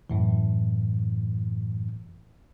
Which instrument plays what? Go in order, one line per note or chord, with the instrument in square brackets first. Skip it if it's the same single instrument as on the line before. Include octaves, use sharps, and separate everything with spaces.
[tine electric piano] F#2 A2 E3